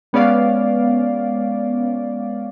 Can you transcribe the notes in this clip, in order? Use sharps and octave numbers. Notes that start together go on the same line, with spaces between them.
G#3 B3 C#4 D5 F5